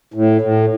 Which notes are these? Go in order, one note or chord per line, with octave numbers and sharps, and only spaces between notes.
A2
A2